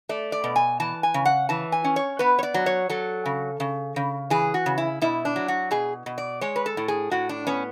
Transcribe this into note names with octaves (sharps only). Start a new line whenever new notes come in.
A3 D5
D5
B2
G#5
E3 A5
G#5
C#3
F#5
E3 A5
G#5
C#4
C#5
B3 B4
C#5
D5
F#3
C#5
F#3 A4
C#3
C#3
C#3
E3 G#4
F#4
C#3
E4
B2 E4
D4
F#3
F#4
B2 G#4
B2
D5
G#3 C#5
B4
A4
A2
G#4
A2 F#4
D4
B3 C#4